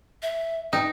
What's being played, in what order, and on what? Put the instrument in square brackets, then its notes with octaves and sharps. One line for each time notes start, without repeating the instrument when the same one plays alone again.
[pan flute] E5
[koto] D#4 [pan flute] G5